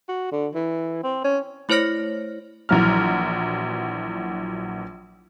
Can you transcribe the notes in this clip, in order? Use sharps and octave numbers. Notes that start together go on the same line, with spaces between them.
F#4
D3
E3
C4
C#4
A3 E4 C5 C#5 F6 A#6
A#1 E3 F#3 A#5 F6